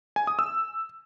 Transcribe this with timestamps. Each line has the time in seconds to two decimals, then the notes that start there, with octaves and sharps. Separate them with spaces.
0.16 G#5
0.27 D#6
0.39 E6